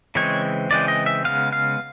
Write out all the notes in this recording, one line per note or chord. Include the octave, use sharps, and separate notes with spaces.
C#3 E3 G#3 C4 C#5
C#3 E3 G#3 C4 D5
D#5
E5
C#3 F3 G#3 B3 F5
F5